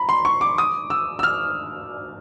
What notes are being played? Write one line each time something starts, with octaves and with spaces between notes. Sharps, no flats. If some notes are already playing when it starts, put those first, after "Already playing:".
Already playing: A#5 B5
C6
C#6
D6
D#6
E6
E6
F6